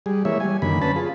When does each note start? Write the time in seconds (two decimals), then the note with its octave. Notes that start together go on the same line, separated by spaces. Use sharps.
0.06 G3 G#4
0.25 E3 G#3 A#3 C#5 E5
0.40 G3 G#5
0.62 F#2 D3 D#3 A#3 B5
0.81 C#4 B4 A5 B5
0.96 F4 G#4